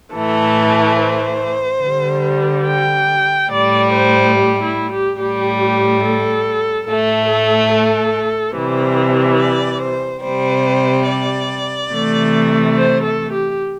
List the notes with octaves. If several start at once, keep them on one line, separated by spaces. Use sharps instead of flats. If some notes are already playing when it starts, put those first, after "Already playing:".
A2 E3 A3 A4
C5
D3
G3
G5
A2 G3 D5
C5
G4
E4
G4
A2 G3 G4
G4
A4
A2 A3 A4
A4
A4
C3 E3 G3 C5
D5
C5
C3 G3 C5
D5
C3 E3 A3
C5
A4
G4